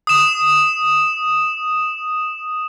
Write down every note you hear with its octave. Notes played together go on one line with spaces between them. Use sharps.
D#6 E7